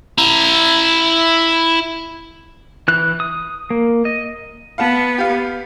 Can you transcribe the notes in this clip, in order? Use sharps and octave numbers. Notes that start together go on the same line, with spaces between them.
E4 A#5
E3 F#6
D#6
A#3
D#5
B3 F5 F#5 A5
G4 F5